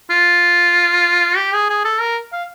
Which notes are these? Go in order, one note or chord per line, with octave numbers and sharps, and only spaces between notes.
F4
G4
G#4
G#4
A4
A#4
F5